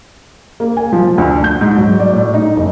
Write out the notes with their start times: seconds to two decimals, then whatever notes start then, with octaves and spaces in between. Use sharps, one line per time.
0.60 A#3
0.77 G#5
0.93 F3
1.18 D2
1.44 G6
1.61 G#2
1.77 F#3
1.99 D5
2.13 A2
2.34 D#4
2.56 F#1